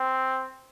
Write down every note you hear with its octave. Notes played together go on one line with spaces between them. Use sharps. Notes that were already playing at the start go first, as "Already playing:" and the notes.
Already playing: C4